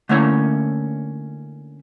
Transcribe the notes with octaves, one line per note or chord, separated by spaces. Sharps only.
D3 A3 A#3 C#4 E4 C#5